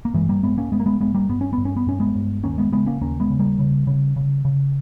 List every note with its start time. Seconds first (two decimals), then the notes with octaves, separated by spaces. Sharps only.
0.05 A#3
0.14 G2 E3 G#3
0.29 G3 A#3
0.43 G2 G#3 B3
0.58 A#3 C#4
0.72 G2 G#3 B3
0.80 A#3
0.86 G#3 B3
1.00 G2 G#3 B3
1.14 G3 A#3
1.29 G2 B3
1.41 C#4
1.53 G2 B3
1.65 C#4
1.76 B3
1.87 G2 C#4
2.00 G#3 B3
2.15 G2
2.44 D#2 A#3 C#4
2.58 G#3 B3
2.73 C#3 G#3 B3
2.86 A#3 C#4
3.01 D#2 A#3 C#4
3.20 G#3 B3
3.30 C#3
3.39 G3 A#3
3.59 C#3
3.87 C#3
4.16 C#3
4.45 C#3